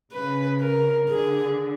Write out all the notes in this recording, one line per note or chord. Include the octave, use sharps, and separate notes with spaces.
C#3 B4
A#4
D3 G#4